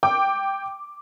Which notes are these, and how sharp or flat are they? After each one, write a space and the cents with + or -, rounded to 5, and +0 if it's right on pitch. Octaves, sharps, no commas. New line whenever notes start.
G5 +0 D6 +0